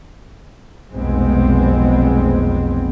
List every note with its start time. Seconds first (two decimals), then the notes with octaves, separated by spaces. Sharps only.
0.93 F1 B1 G#3 B3 C4